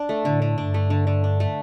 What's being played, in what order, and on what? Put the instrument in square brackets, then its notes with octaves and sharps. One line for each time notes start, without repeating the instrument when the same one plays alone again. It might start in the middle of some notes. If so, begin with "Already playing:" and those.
Already playing: [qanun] D4
A3
[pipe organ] A2 [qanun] D3
[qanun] D3
[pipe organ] G2 [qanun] D4
[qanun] A3
D3
D3
D4
A3